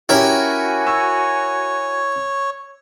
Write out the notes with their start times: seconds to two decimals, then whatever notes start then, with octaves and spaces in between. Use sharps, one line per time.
0.09 C#4 E4 F#4 G4 A#4 G#5
0.87 C#5 E6